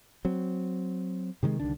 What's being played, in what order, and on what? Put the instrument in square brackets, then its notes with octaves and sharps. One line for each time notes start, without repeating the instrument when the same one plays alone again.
[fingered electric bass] F#3 C4
C3 D#3 E3 G#3
C2 D3 D#3 D4